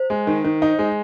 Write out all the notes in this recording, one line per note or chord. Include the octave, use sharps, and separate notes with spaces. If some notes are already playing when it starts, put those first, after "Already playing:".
Already playing: C5
G#3
D#3
D#3
D#4
G#3